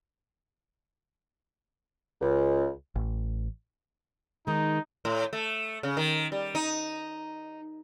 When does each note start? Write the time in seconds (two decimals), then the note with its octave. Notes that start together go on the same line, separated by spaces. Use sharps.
2.22 C#2
2.96 A1
4.47 D#3 G#3 D#4
5.05 A2
5.33 A3
5.83 C#3
5.97 D#3
6.32 G3
6.55 D#4